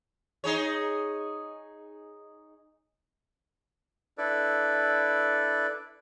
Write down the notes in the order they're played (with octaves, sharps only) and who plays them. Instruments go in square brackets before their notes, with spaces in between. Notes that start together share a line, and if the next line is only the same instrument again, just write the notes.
[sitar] D#4 G#4 C#5
[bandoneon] D4 E4 A4 B4 D5